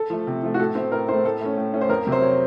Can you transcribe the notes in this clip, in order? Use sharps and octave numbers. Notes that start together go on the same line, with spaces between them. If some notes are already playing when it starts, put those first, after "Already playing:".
Already playing: A4
F3 A3
C3
F3 A3
F#4
A2 A4
A3 C4
A2 A#4
A3 C4 C5
A2 A4
A3 C#4
A2
A3 C#4
C5
F2 A#4
C3 F#3
C5
C#5